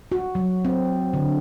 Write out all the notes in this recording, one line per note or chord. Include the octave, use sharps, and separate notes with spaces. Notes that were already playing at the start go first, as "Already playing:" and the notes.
F#4
F#3
C4
D3